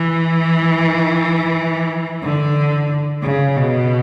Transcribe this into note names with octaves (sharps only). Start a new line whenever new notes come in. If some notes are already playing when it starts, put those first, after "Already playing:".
Already playing: E3
D3
C#3
B2